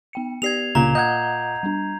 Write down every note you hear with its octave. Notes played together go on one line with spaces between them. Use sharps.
B3 G5 C#7
B3 G4 D5 G#6 C7 F7
C#2 A#2 C#3 A#5 G7
D#5 F#5 G6 G#6
G3 D4